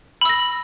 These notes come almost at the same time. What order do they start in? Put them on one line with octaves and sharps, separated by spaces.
B5 E6 A#6